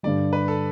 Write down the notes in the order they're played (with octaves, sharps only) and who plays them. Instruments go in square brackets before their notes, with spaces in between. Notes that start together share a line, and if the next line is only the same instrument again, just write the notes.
[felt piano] G2 D3 G3 [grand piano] D5
[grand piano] B4
A4